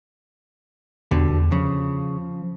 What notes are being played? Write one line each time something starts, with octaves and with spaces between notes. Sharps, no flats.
E2 B2 D3 G3
E2
C#3 F3